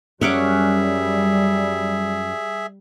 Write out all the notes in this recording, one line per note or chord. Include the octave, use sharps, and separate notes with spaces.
F#2 G3 C#4 G#4 E5 F#5 D6